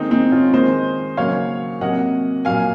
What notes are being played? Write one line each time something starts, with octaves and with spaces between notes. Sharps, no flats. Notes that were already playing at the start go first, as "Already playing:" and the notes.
Already playing: D#3 G#3 C4 D#4
C4 D#4
C#4 F4
D#3 G#3 C5 D#5
C#3 F#3 A#3 C#5 F5
C3 F#3 A#3 D#5 F#5
A#2 F#3 A#3 F5 G#5